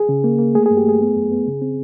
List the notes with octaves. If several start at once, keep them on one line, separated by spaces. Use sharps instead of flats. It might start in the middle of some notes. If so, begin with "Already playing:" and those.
Already playing: G#4
C#3
A#3
A#3
A3 G#4
G#4
G2
G4
A3 G#4
B3
F#2
B3
C#3
C4